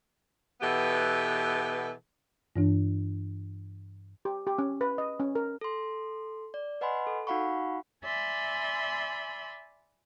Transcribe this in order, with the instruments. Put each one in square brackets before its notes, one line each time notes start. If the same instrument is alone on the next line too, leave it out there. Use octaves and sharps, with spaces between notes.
[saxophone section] B2 E3 B3 G4 A4
[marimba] G2 E3 D4
[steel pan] G4
G4
C#4
B4
D#5
C#4
A#4
[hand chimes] A4 C6
D5
B4 D#5 F#5 G#5 B5 C6
A4
D#4 F#4 F5 F#5 B5 C#6
[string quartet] D5 E5 G#5 B5 C6